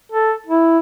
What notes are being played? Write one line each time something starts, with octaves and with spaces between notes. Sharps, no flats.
A4
E4